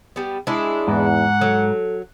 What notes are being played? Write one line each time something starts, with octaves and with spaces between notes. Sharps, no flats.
G3 B3
G#3 D4 E4
E2 G#2 F#5
F#3 A4